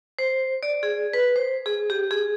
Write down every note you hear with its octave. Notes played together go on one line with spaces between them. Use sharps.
C5
D5
G#4
B4
C5
G#4
G4
G#4